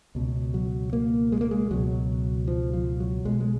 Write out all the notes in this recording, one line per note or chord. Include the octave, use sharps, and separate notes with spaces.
C#2 B2
F#3
A#3
G#3
A#3
G#3
C#2 B2 F#3
F3
F3
F#3
B1 B2 G#3
G#3